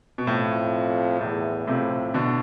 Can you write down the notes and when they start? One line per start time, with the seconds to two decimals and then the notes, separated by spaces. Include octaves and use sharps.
0.18 B2
0.27 F2 A2
1.20 E2 A2
1.67 F2 A2 C3
2.14 B2 D3